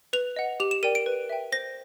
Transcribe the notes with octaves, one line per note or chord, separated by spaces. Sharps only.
B4 F7
D#5 F#5
G4 F7
E7
A#4 D5 G5 D#7
D7
B4
E5 G5
C5 A#6